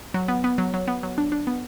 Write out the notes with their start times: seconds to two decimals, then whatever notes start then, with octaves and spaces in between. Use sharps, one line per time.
0.14 F#3
0.28 B3
0.44 B3
0.58 F#3
0.74 F#3
0.88 B3
1.03 F#3
1.18 D4
1.32 D4
1.47 B3